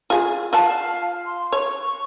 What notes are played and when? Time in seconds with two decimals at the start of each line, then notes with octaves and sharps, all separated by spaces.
0.10 F4 G#4
0.53 F4 F5 F#5 A5
1.26 C6
1.52 C#5 C#6